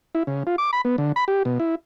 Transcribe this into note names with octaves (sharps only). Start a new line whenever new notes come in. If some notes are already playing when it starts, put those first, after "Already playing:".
E4
C#3
F4
D6
B5
B3
D3
B5
G4
B2
E4